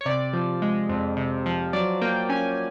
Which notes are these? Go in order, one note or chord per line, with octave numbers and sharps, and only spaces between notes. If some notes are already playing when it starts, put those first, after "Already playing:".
C#5
C3 D5
F3
G#3
F2
C3
F3
F#3 D5
A#3 G5
C#4 G#5